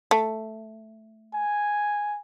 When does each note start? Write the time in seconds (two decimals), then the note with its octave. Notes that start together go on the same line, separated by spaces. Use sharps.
0.11 A3
1.35 G#5